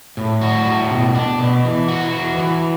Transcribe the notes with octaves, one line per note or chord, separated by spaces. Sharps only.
A2
F#4
A2
B2
D4
B2
E3
F#4
E3
E3